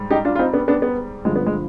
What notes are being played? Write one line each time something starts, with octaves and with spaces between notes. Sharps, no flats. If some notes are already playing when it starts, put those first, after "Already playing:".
Already playing: G#2 G3
D#4 G4
D4 F4
F4
C4 D#4
B3 D4
B3 D4
B3
G2 D3 F3 G#3
B3
G#3